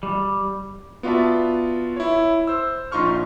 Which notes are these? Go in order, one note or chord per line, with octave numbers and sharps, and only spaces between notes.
G3
B3 F4 F#4 D5 E5 A5
E4 C#5
C5 E6
A#1 D#4 F4 C6 C#6 F6